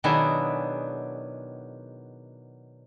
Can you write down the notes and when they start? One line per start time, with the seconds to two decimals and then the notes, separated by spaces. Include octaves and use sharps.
0.04 B2 D#3 F#3 D4 E4 G#4